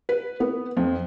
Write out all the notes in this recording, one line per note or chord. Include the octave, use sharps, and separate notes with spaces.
B4
B3
F2